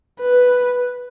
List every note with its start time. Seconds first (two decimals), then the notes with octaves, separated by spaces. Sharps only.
0.20 B4